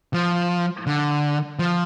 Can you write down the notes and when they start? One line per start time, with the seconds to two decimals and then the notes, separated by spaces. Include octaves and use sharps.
0.14 F3
0.87 D3
1.59 F3